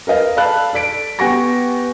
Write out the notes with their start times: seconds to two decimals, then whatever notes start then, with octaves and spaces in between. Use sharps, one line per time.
0.07 A#4 B4 D#5 F5
0.37 A4 D5 F5 A5 B5 F#6
0.73 A4 D5 B6 D7
1.19 B3 G4 F#5 G#5 C#6 A#6